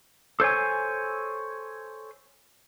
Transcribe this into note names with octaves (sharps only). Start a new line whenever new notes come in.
A4 C5 C#5 G#5